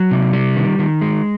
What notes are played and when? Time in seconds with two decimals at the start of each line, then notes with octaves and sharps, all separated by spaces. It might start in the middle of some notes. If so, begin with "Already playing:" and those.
Already playing: F#3
0.11 C3
0.33 G3
0.56 D#3
0.79 D#3
1.01 G#3